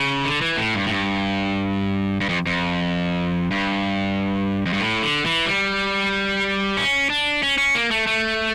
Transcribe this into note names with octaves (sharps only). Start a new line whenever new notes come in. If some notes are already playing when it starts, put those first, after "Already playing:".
Already playing: C#3
D3
E3
A2
G2
A2
G2
G2
F2
F2
G2
F2
G2
A2
D3
E3
G3
C#4
D4
C#4
C#4
A#3
A3
A3